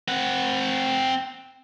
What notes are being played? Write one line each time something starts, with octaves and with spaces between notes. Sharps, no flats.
C4 F#5